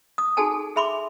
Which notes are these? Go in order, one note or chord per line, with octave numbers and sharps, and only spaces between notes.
D#6
D#4 F#4 G#4 A4 G#5 A5
G#4 E5 B5 C6 D6